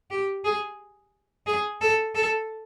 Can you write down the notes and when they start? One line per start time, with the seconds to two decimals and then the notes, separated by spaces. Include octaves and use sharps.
0.10 G4
0.44 G#4
1.46 G#4
1.81 A4
2.15 A4